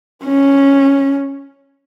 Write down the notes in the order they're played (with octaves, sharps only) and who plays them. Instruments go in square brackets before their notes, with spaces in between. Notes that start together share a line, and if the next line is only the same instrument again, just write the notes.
[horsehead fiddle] C#4